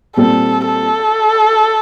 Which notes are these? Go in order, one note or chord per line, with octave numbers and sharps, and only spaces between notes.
A#2 G3 C4 A4
A4